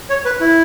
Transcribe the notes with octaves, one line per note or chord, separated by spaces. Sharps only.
C#5
B4
E4